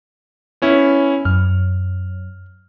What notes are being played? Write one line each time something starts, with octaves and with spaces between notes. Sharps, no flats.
B3 C#4 E4
F#2 F6